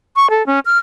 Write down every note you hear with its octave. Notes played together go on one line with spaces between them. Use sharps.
C#6
A4
C#4
F6